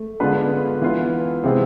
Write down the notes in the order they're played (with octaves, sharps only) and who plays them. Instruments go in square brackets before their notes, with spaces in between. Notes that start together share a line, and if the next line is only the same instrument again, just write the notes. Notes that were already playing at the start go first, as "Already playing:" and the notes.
Already playing: [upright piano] A3
[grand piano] D3 G#3 B3 F4 B4 [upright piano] D4
[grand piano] E3 B3 F4 B4
[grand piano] C3 E3 G#3 C4 F4 [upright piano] B3